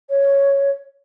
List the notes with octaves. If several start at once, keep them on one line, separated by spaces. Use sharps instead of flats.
C#5